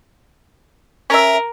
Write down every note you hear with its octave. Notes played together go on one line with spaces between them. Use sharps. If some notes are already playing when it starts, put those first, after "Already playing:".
C#4 A#4 E5